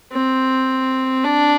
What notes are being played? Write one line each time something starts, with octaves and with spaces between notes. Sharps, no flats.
C4
D4